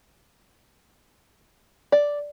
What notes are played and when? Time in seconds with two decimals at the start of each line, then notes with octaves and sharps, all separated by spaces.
1.92 D5